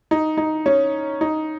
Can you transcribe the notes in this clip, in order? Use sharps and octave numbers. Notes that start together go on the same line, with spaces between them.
D#4
D#4
C#4
D#4